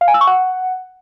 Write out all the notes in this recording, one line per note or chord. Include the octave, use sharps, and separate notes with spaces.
F5
G#5
E6
C#6
F#5